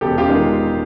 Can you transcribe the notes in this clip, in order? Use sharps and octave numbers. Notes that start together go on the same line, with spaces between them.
E1 G4 A4
F4 G4
D#3 G#3